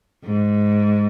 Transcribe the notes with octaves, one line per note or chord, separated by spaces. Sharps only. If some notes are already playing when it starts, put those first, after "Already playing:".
G#2